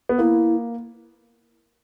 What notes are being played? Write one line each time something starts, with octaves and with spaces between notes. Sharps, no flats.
B3
A#3 E4